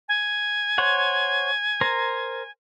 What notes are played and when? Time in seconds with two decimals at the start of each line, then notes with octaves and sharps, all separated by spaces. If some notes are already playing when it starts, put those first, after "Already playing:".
0.08 G#5
0.78 C5 C#5 F#5
1.81 A#4 C5 A#5